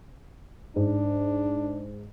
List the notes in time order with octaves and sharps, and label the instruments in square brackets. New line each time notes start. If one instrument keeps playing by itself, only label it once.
[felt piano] G#2 [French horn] D4